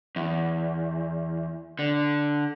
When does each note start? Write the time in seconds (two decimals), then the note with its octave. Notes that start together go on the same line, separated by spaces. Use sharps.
0.16 E2
1.79 D3